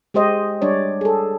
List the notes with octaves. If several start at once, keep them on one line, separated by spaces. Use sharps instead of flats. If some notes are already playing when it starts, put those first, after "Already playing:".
G#3 G4 C5 D#5
G3 D4 C#5 D5
G#4 A4